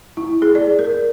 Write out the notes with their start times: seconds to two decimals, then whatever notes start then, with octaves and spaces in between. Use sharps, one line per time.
0.17 E4
0.42 G#4
0.55 D5
0.79 A#4